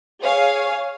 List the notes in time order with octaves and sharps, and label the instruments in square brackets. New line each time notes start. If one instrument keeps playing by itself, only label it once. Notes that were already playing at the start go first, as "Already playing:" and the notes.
[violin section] G#4 C#5 F5